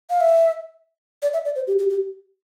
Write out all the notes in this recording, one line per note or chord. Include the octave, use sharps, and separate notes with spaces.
F5
E5
D5
E5
D5
C5
G4
G4
G4